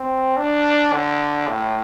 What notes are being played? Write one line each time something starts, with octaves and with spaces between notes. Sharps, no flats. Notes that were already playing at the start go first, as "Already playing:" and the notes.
Already playing: C4
D4
D3
A2